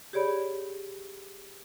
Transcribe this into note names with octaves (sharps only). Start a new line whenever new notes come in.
G4 G#4 C#5 D5 B5